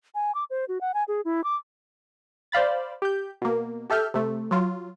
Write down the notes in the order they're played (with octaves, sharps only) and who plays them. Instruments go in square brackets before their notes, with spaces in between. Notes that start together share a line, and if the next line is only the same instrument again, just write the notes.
[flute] G#5
D6
C5
F#4
F#5
G#5
G#4
E4
D6
[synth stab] C5 D5 F5 B5 A6
G4 G6
B2 A#3
G4 A4 E5 F6 G6
C3 A3
F#3 F4